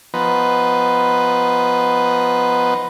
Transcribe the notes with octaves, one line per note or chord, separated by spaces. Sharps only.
F3 B3 D#4 B4